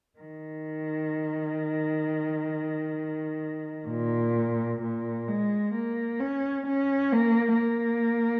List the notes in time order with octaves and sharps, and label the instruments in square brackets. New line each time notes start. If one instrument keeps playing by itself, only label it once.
[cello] D#3
A#2
A#2
G#3
A#3
C#4
C#4
A#3
A#3